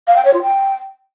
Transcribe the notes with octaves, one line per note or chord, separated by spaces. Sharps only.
F5
G5
C#5
F4
G5